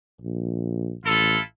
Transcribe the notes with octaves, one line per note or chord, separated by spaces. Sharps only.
A#1
A1 E4 F4 A4